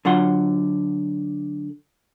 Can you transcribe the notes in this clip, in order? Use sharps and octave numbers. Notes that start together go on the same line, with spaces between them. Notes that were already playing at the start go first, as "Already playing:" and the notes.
D3 F#3 F4 F#5 C6